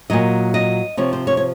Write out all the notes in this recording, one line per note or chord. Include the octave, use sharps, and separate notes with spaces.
A#2 F#3 D#5
D#5
C3 F3 C#5
C5
C#5
C#5